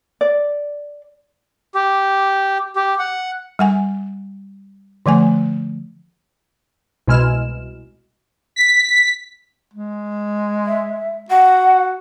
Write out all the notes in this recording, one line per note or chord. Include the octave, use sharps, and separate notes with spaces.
D5
G4
G4
F#5
G3 F#5 G#5
D3 F3 A3 G#5
C2 B2 G#3 E4 F6 E7
B6
G#3
E5
F#4 F#5